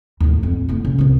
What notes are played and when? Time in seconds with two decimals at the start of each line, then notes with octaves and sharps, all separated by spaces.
0.20 D#2 A2
0.43 F2
0.69 A2 A#3
0.85 C#3
0.99 C2 E3